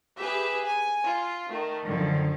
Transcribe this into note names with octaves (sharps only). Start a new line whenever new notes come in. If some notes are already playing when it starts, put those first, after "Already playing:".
G4 G#4 B4 E5
G#5
F4
D#3 A3
F#2 D3 D#3 F3